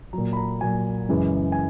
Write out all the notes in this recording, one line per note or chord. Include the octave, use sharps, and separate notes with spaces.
A#2 F#3 A#5
B5
A#5
A#2 F#3 G#5
F#2 C#3 E3 G#3
G#5